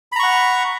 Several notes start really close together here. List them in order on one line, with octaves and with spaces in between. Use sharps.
B5 A#5 C#6 F#5